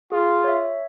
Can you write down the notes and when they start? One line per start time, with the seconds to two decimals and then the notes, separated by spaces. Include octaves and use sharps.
0.12 F4 G#4
0.44 C#5 E5